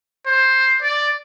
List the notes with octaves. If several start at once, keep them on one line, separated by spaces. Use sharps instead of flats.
C5
D5